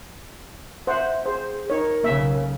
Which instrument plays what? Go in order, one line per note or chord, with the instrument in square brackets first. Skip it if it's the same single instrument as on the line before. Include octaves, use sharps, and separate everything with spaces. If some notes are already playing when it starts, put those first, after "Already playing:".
[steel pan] C5 F#5 [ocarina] E5
[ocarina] G#4 [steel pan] C5
[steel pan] D#4 C#5 [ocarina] A#4
[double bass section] B1 C#3 [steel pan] A#3 E5